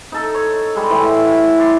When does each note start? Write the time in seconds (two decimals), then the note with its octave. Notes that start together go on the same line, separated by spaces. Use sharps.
0.12 D#4 A4
0.35 C#5
0.75 G3 G#3 A4
0.90 A2 E3 G4
1.26 F#5
1.60 D5 C6